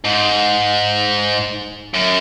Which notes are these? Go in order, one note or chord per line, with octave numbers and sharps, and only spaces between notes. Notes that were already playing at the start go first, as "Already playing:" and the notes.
G#2
F#2